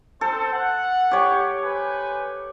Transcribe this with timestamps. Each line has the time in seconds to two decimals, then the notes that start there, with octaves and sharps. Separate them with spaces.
0.21 C4 A4 C5
0.52 F#5
1.11 G4 C#5
1.64 B4 C5 G#5